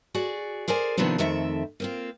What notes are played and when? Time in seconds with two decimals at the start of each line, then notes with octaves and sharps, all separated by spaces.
0.15 F#4 G#4 D5
0.68 G#4 A#4 C5 D5 G#5
0.97 C3 D#3 F3 B3 C4 D4
1.18 F2 D#3 A3 C4 E5
1.80 A#3 C4 F4